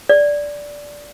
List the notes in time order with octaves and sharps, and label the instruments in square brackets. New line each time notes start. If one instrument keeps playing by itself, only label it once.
[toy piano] D5